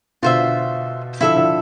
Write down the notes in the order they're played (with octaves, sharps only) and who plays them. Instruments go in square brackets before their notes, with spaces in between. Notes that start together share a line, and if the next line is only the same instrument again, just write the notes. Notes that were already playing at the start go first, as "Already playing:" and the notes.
[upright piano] B2 D3 [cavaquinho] F4 C5 E5
[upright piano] D3 F3 [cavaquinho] E4 A4 E5
[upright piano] D3 F3